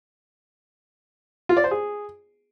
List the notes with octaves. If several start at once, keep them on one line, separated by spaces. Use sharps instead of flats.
F4
D5
C5
G#4